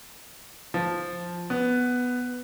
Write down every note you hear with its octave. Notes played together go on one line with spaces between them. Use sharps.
F3
B3